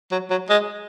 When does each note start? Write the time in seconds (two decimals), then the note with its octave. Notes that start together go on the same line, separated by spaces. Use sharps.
0.11 F#3
0.30 F#3
0.50 G#3